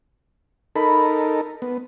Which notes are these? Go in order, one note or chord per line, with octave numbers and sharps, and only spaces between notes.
D#4 A4 A#4 B5
B3